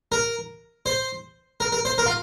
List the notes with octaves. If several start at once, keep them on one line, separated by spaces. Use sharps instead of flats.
A#4
C5
A#4
A#4
C5
A#4
F4